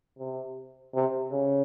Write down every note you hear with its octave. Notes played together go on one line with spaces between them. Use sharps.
C3
C3
C#3